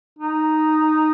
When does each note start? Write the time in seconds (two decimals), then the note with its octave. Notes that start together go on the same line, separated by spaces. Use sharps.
0.19 D#4